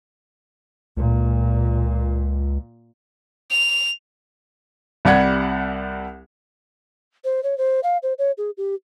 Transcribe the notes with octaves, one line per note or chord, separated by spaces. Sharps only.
C#2 A#2
F7
C2 G3 D5 F#5 G#6
C5
C#5
C5
F5
C5
C#5
G#4
G4